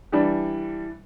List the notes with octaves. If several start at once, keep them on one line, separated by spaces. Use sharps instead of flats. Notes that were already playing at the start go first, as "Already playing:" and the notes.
E3 G3 D4